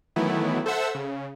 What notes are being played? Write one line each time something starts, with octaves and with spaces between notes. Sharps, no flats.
D#3 E3 F#3 A3 B3 E4
A4 C5 E5 F#5 E6
C#3